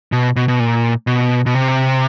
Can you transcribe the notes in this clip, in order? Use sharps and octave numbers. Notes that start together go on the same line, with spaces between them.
B2
B2
B2
A#2
B2
B2
C3